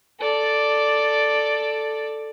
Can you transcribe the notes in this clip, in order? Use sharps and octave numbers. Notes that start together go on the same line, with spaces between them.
A4 D5